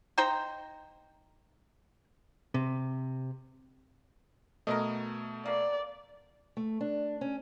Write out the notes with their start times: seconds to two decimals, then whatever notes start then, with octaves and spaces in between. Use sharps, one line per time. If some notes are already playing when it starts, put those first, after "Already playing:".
0.18 D#4 C5 G5 A#5
2.54 C3
4.67 B2 A3 A#4 B4 D#5
5.45 A#3 B3 D5
6.57 A3
6.81 D4
7.21 C#4